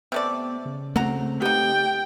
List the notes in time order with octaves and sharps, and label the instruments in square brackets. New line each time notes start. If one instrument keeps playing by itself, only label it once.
[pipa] C3 A3 D5 [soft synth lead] B3
[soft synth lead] C#3
[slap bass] A3 C4 [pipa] F#4 A#5
[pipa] B3 D#4 [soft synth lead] G4 [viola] G5